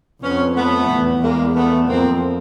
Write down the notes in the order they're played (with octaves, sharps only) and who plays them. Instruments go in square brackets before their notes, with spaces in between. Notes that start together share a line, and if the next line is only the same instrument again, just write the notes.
[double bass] F2 [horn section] B3 C#4
[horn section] A3 B3
[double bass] E2
[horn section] G#3 A#3
A3 B3
[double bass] F2 [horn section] A#3 C4